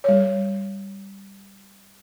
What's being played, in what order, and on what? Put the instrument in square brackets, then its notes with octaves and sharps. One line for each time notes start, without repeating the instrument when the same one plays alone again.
[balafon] G3 C#5